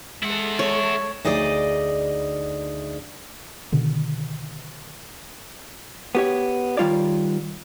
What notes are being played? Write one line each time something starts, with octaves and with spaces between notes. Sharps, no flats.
G#3 E4 A4 F#5
C#5
D2 D#4 G#4 D5 D#5
B2 D3 D#3
B3 G4 C#5
D#3 G3 F4 C#5 D5